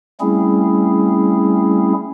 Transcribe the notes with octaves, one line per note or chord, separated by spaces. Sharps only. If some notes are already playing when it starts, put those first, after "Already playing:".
G3 A3 C4 C#4 E4 G#4